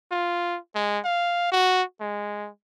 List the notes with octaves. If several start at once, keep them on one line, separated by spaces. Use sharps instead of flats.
F4
G#3
F5
F#4
G#3